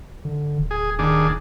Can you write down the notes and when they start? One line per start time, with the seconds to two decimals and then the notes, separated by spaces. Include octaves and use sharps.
0.25 D3
0.59 D1
0.71 G#4
0.99 D#2 D4 G#4